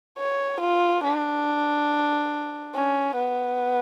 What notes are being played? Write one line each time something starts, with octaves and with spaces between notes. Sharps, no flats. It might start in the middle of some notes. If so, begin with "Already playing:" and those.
C#5
F4
D4
C#4
B3